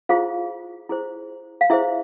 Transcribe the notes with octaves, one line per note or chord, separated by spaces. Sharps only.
E4 F4 G#4 C5 F5
E4 G#4 C5
F5
E4 G#4 C5 E5